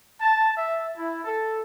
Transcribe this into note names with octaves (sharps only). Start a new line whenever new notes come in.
A5
E5
E4
A4